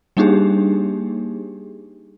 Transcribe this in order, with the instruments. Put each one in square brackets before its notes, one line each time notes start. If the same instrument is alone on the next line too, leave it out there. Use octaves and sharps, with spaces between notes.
[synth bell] G3 A#3 D4 D#4 G4 G#4